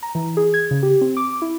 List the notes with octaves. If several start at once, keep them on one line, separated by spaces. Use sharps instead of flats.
A#5
E3
G#4
G#6
C#3
G4
C4
D6
E4